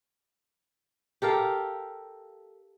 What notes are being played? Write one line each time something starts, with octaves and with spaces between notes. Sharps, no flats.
G4 A4 A#4 F5